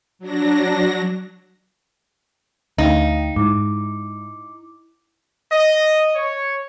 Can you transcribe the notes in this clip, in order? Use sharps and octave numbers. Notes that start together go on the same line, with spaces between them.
F#3 D4 A#6
D2 D#4 F5 G5
G#2 E4 D6
D#5
C#5